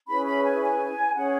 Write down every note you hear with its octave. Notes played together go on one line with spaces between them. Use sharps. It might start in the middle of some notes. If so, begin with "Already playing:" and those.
C#4 E4 G#4 B4 B5
B5
G#5
G#5
C#4 G#4 C#5 F#5